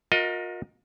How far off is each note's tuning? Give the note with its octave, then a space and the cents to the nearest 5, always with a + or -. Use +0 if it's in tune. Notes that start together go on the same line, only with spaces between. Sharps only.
F4 +45 A#4 +5 D#5 +15